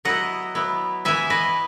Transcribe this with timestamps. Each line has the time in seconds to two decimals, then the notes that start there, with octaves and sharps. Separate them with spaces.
0.05 F#3 B3 E4 D#5 F#5
0.55 F#3 B3 E4
1.05 E3 B3 E4 E5 G#5
1.30 B4 D#5